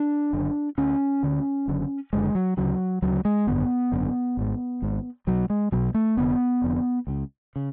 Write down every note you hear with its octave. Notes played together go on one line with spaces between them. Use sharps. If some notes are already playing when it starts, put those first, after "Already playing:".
Already playing: D4
F#1 F#2 D3
D2 D3 C#4
D2 D3
F#1 F#2 D3
F#1 F#2 D3 G#3
F#3
D2 C#3 F#3
D2 C#3 F#3
G#3
G#1 F#2 D3 B3
G#1 F#2 D3
G#1 G#2
G#1 G#2
B1 B2 F#3
G#3
B1 B2 F#3
A3
F1 F2 D3 B3
F1 F2 D3
C#2 C#3
C#3